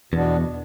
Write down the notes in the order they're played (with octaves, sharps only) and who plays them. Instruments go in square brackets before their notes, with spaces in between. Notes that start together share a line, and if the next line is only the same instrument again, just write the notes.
[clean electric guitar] E2 [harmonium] B2 B3 D4